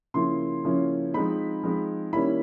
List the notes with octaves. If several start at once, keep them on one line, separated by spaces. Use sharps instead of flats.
C#3 F3 A#3 C#4 E4 C6
C#3 F3 A#3 C#4 E4
F3 G#3 C4 D#4 B5
F3 G#3 C4 D#4
D#3 G3 A#3 C#4 E4 B5